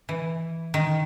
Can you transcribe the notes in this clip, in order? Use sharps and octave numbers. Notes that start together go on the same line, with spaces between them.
E3
D#3